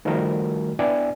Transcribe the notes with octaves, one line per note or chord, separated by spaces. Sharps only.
D#3 F3 G3 A3 F#4 A#4
B3 D4 E4 D5 G5 G#5